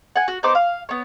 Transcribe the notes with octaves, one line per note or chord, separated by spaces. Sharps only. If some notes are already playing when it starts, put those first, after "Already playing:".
F#5 G#5
F#4
B3 D#4 C5 D6
F5
B3 C#5